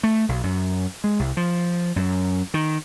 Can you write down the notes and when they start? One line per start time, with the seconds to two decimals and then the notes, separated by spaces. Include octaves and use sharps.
0.03 A3
0.29 B1
0.43 F#2
1.04 G#3
1.19 C2
1.37 F3
1.96 F#2
2.54 D#3